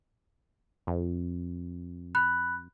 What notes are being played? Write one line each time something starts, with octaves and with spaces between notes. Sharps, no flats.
F2
B5 F#6